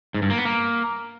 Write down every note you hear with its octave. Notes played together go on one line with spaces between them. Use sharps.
G#2
G2
A#3
B3
A#3